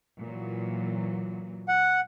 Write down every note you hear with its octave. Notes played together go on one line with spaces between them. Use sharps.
A#2 E3 F#3
F#5